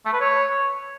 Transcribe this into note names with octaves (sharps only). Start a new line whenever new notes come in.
A3
B4
C#5